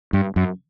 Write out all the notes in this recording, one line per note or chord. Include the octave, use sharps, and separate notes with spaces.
G2
F#2